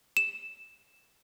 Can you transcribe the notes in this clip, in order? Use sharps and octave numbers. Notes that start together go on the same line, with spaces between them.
E7